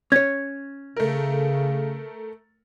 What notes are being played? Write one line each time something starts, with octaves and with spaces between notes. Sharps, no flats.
C#4 C#5 G#6
C#3 A3 A#4